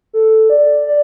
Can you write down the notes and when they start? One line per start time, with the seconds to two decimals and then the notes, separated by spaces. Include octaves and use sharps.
0.13 A4
0.50 D5
0.87 D5